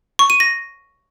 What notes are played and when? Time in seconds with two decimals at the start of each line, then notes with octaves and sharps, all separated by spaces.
0.19 C#6
0.30 D#7
0.40 A#6